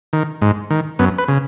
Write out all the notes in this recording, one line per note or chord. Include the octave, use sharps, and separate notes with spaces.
D#3
G#2
D#3
F#2 B3
B4
C#3